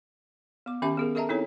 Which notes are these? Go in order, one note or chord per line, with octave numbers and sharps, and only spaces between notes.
B3 D6
D#3 C#4 G4 E5 A5 D6
B3 G#4 A#4
A4 A#4 D#5 E5 A5 A#5
C4 D#4 E4 A4 C#5